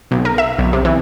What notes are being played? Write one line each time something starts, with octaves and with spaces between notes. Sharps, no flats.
B1
A#4
E5
B1
C3
E3